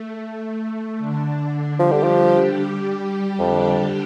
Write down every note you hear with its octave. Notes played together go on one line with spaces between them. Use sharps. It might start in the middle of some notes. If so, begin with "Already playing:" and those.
Already playing: A3
D3 D4
F3 G3 G4
D3
F3
G3 G4
F2 D3 D4